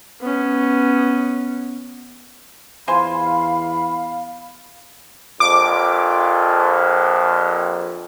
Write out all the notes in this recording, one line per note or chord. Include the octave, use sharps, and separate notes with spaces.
B3 C#4
E2 F4 C5 F5 G#5 B5
A#1 F2 D6